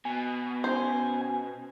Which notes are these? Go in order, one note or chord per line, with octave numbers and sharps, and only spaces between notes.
B2 G#5
C#4 C5